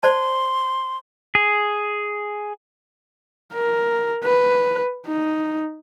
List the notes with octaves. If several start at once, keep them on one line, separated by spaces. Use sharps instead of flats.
C5 D5 A5 C6
G#4
A#4
B4
D#4